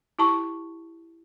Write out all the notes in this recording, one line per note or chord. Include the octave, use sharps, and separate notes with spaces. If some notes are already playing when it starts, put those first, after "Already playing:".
E4 G4 A5 C#6